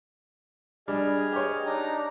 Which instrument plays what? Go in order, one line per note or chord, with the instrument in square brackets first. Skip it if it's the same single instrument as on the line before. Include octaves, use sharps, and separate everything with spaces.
[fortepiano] G3 D4 [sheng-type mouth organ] G#4 D#5 F6
[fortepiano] G4 C#5
[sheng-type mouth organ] D4 D#4 A#5